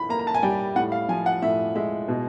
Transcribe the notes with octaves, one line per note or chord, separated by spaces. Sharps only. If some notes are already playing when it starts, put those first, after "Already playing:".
Already playing: E3 B5
A#3 A#5
A#5
A5
G#5
G3 G5
A2 F#5
F5
F3 G#5
F#5
A2 E5
G#3 E5
B2